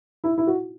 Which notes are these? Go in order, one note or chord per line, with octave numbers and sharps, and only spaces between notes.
E4
E4
F#4